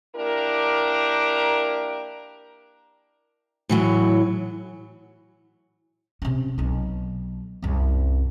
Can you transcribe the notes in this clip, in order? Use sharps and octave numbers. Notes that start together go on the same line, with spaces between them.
A#3 D4 E4 G4 A#4
A2 E3 F#3
C3 C#4
B1 D#4
C2 F#2